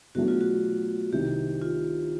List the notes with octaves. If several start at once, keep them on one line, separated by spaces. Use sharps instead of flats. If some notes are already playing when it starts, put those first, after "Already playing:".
E2 B2 F#3 A3 D4 F#4
F4
F#4
C2 C3 D#3 G4
F4